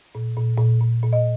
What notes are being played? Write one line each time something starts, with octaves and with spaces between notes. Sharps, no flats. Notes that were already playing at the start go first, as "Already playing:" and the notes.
A#2
A#2
A#2
A#2
A#2
D#5